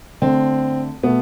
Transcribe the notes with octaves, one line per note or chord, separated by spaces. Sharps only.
D3 A3 C4
B2 A3 B3